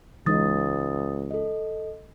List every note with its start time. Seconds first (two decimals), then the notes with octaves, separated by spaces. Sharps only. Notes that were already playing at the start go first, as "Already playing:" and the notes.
0.26 C#2 E3 G#3 D#4 D#6 A6
1.31 A4 D#5